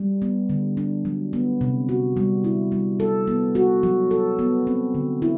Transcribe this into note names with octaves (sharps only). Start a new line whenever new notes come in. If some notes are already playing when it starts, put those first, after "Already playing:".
Already playing: G3
B3
D3
D4
F#3
B3
C3
F#4
G3
E4
G3
A4
B3
F#4
F#3
A4
B3
C4
D3
E4